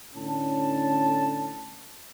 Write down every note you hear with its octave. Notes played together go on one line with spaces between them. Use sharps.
A2 D3 C#4 A5